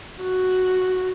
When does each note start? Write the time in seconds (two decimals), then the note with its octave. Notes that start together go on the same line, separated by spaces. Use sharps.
0.23 F#4